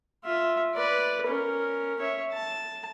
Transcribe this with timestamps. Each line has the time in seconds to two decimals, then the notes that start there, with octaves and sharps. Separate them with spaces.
0.25 F4 E5
0.75 B4 D5
1.27 C#4 A#4
2.00 C#5 E5
2.33 A5